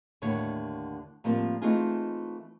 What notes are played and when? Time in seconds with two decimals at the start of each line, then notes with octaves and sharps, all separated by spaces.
0.22 D#2 A2 D3 C#5
1.24 A2 F3 G3 A#3 C4
1.62 E3 A3 C4 D#4 F4 G#4